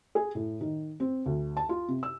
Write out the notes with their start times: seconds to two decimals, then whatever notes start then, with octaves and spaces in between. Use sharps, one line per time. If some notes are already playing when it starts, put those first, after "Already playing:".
0.15 G#4
0.35 A2
0.61 D#3
1.00 C4
1.26 D2
1.57 A5
1.69 F4
1.88 C3
2.03 E6